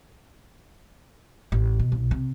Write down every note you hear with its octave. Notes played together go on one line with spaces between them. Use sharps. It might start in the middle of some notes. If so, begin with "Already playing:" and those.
A1
B2
B1
C3